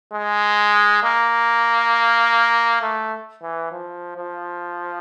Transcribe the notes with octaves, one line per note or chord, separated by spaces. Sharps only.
G#3
A#3
A3
E3
F3
F3